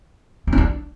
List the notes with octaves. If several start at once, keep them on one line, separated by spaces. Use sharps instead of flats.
C4
C#4
D4